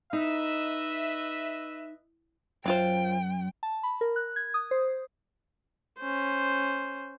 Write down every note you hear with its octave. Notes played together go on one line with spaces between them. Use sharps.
D#4 B4 D#5 E5
F#2 F#3 F4 C5 G5
A5
B5
A#4
F#6
G#6
D#6
C5
C#4 C5